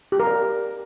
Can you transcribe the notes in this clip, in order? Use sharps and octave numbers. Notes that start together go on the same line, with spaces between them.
G4
A#4
D5